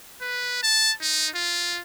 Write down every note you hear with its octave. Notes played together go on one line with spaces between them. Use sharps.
B4
A5
D#4
F4